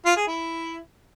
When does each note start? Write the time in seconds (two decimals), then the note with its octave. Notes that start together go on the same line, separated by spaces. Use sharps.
0.05 F4
0.16 G#4
0.27 E4